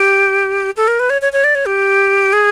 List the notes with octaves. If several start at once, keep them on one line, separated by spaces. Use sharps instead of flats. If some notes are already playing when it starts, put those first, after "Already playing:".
Already playing: G4
A4
A#4
B4
C#5
C#5
C#5
D5
C#5
G4
G#4